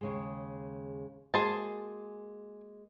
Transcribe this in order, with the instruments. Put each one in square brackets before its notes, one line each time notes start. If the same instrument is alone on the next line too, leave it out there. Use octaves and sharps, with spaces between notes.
[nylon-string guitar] D#2 C#3 G#3
[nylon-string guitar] G#3 A#3 F#4 [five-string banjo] G#4 C5 A5